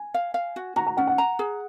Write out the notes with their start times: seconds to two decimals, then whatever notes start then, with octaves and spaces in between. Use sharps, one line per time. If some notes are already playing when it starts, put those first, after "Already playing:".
Already playing: G#5
0.14 F5
0.34 F5
0.56 F#4
0.76 F#4 A#5
0.87 A#5
0.97 C#4 F#5
1.07 F#5
1.18 A#5
1.39 G#4